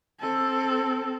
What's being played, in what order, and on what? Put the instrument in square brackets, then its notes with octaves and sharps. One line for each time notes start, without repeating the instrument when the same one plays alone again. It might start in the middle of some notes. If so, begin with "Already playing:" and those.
[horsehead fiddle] C4 A4